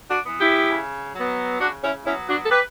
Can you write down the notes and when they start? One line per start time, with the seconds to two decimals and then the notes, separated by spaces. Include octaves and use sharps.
0.10 D4 F#4
0.25 E3 B3
0.40 E4 G4
0.70 C#3
1.15 F#3 B3
1.60 C#3 D4 F#4
1.83 C#4 E4
2.05 F#3 B3 C#4 E4
2.28 D4 F#4
2.45 A4
2.51 G4 B4